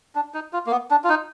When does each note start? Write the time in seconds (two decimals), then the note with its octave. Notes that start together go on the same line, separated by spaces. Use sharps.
0.15 D4
0.34 D#4
0.53 F4
0.66 A#3
0.71 B3
0.91 D4
1.04 F4
1.09 D#4